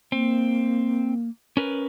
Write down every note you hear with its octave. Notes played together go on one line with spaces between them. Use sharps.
A#3 C4
C#4 A#4 B4